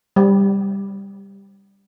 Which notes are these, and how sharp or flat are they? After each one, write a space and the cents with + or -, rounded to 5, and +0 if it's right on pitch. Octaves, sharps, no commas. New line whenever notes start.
G3 +10